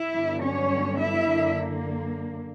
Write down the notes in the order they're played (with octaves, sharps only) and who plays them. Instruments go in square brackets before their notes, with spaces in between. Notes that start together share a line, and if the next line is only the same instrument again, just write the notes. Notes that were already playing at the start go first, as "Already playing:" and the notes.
Already playing: [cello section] E4 E5
G2 D3 F#3 B3 D4
C#4 C#5
E4 E5
F#2 D3 A#3 D4